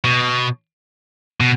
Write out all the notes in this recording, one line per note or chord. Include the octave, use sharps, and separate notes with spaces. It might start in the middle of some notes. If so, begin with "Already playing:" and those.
B2
B2